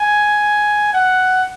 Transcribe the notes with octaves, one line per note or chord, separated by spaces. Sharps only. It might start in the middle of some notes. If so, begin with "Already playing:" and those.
Already playing: G#5
F#5